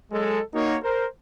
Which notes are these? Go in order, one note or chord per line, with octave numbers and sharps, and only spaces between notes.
F#3 G#3 A4
A#3 D#4 F#4 C#5
A#4 C5